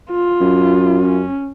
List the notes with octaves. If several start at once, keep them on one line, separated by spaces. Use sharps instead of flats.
F4
F#2
C#4